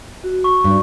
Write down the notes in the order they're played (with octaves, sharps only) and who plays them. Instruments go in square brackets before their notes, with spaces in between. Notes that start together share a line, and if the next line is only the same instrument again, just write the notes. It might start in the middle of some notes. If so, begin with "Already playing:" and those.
[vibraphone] F#4
[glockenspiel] C#6
[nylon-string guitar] G2